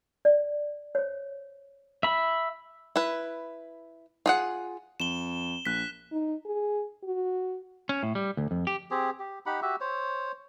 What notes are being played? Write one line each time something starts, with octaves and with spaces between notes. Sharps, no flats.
D5
C5 C#5
E5 B5
E4 B4
F4 G#4 F#5
F2 E7 G7
A#1 F#6 B6
D#4
G#4
F#4
C#4
A2
G3
D2
F2
G4
C4 G4 G#4
G4
D#4 G4 F#5 B5
F#4 G4 E5
C5 C#5